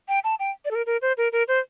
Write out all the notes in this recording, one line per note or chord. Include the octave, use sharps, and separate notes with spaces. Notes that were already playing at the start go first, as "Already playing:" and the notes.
G5
A5
G5
D5
A4
A#4
A#4
C5
A#4
A#4
C5